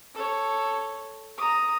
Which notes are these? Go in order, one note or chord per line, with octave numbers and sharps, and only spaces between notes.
A4 C#5
A#5 D#6